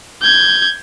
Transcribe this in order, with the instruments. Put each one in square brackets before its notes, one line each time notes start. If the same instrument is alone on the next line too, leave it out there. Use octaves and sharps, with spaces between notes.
[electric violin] G6 G#6